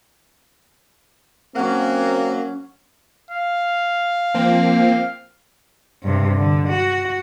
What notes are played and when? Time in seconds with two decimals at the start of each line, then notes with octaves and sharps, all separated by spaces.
1.56 F#3 A#3 C4 C#4 F#5
3.30 F5
4.34 F3 A#3 C4
6.03 G2 C3
6.38 D3
6.68 F#4